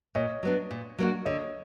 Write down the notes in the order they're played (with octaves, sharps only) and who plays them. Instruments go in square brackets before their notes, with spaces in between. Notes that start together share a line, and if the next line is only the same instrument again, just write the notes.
[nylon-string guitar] A#2 [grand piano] C#5 D#5
[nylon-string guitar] F#3 B3 D4
A#2
F#3 A#3 D4 F#4
[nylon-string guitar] D3 [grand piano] C#5 D#5